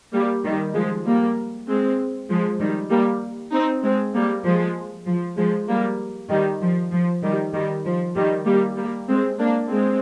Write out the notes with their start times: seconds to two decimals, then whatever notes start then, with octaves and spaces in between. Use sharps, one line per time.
0.13 G3 A#3
0.45 D#3 G3
0.74 F3 G#3
1.06 G3 A#3
1.67 G#3 C4
2.30 F3 G#3
2.59 D#3 G3
2.90 G3 A#3
3.52 C4 D#4
3.83 G#3 C4
4.14 G3 A#3
4.45 F3 G#3
5.06 F3
5.37 F3 G#3
5.69 G3 A#3
6.30 D#3 G3
6.62 F3
6.91 F3
7.23 D#3 G3
7.53 D#3 G3
7.85 F3
8.15 D#3 G3
8.46 G3 A#3
8.77 G3 A#3
9.08 G#3 C4
9.39 A#3 D4
9.69 G#3 C4